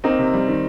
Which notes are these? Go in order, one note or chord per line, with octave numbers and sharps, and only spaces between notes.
A#3 C4 D#4
C3
G3
D#3